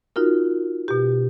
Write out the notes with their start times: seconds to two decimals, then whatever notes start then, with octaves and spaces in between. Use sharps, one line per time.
0.16 D#4 F4 F#4 A#4
0.88 B2 G4